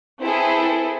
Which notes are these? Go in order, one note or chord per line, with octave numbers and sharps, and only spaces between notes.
C4 E4 G#4 A4 B4